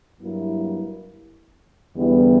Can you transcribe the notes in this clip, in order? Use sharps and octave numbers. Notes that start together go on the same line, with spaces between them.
G2 F#3 A#3 E4
E2 D3 G3 B3 E4